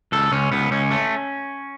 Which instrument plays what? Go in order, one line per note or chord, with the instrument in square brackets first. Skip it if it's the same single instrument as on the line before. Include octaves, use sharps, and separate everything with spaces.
[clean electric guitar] C#2 A4
C#2 C#4
C#2 B3
C#2 C#4
A3